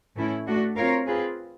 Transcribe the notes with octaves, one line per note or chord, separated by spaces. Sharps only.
A2 E3 A3 C#4 E4
A3 D4 F#4
C4 F4 A#4 C#5 F5
C4 F4 G#4 B4